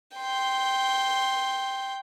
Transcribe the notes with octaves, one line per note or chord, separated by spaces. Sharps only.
G5 C6